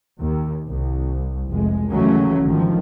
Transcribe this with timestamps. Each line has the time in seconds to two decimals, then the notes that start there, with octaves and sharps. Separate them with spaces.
0.20 D#2
0.68 C2
1.51 F1 G#3
1.91 D#2 C#3 E3 F#3 A3 C#4
2.44 G#1 D3 D#3 F3